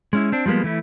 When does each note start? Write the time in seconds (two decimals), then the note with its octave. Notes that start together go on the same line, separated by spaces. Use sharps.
0.13 G#3 C#4 E4
0.32 C4 D4
0.46 F3 G3 G#3 A#3 B3
0.64 E3 A3 E4